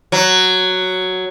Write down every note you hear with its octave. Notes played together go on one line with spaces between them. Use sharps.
F#3